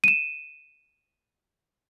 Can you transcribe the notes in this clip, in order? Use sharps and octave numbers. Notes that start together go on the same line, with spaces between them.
D#7 E7